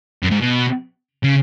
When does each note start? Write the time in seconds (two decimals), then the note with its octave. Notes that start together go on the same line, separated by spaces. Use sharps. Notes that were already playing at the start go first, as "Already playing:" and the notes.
0.23 F#2
0.31 G#2
0.41 B2
1.24 C#3